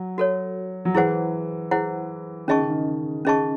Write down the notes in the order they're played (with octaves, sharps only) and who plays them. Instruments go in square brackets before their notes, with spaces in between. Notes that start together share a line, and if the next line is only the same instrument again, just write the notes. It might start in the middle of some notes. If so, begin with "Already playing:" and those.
Already playing: [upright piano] F#3
[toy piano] F#4 A4 C#5
[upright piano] F#3
[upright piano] E3 [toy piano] E4 G#4 C5 F#5
[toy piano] E4 G#4 C5 F#5
[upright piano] D#3 [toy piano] C#4 G#4 D#5 A5 C#6
[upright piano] C#3
D#3
[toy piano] C#4 G#4 D#5 A5 C#6